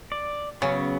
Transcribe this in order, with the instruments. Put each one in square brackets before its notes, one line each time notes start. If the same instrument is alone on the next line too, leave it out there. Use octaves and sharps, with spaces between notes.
[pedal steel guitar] D5
[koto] C#3 [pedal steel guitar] F#3 B3 C#4